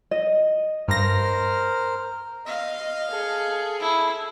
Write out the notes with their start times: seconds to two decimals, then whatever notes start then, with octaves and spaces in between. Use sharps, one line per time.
0.11 D#5
0.88 G2 A#4 C5 F6 A#6
2.46 D#5 F5
3.09 G#4 A4
3.80 E4